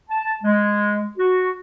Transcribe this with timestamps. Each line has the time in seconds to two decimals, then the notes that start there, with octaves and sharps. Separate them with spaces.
0.10 A5
0.43 G#3
1.18 F#4